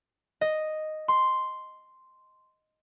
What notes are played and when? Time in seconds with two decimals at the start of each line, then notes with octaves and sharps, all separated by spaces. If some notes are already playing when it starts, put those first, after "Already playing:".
0.41 D#5
1.08 C6